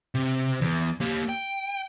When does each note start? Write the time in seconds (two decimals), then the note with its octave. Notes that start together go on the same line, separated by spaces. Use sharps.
0.15 C3
0.61 E2
1.01 A#3 G4
1.29 G5